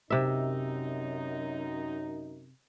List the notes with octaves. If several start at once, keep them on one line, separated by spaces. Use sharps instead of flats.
F#2 C3 D#4 E5